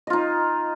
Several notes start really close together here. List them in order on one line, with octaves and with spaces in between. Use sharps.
D#5 F4 D#4